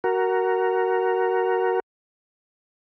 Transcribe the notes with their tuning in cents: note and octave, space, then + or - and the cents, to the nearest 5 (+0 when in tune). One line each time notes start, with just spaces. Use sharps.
F#4 +15 A#4 +0